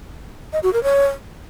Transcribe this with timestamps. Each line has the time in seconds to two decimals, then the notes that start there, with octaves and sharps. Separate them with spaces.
0.53 D#5
0.63 F#4
0.73 A#4
0.83 C#5